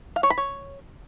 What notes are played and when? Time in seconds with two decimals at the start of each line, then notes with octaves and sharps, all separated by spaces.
0.16 F5
0.23 C#5
0.30 B5
0.38 C#5